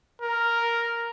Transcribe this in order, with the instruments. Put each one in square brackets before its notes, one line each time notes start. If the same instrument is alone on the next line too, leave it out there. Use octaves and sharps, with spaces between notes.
[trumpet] A#4